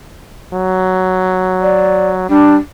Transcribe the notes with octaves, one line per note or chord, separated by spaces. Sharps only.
F#3
D5
G3 D4